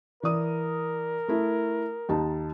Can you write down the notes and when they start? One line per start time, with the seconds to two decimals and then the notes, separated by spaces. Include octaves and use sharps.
0.23 E3 A#4 D5 D#6
1.28 A3 E4
2.09 D#2 D#4 A5